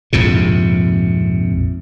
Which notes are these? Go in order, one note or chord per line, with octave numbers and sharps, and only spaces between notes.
A#1 F2 G#2 C3